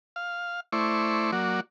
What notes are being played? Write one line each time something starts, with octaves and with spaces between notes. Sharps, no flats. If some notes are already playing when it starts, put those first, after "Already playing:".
F5
A3 E4 C5 D5 C#6
F#3 A#3 F#4 D5